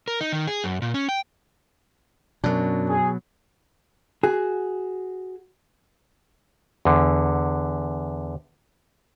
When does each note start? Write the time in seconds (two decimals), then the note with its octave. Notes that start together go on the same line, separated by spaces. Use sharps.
0.08 A#4
0.21 D#4
0.33 D#3
0.47 G#4
0.64 F#2
0.82 A#2
0.94 C#4
1.09 G5
2.44 F#2 B2 F#3 D4
2.88 G#4
4.23 F#4 G#4
6.85 E2 D3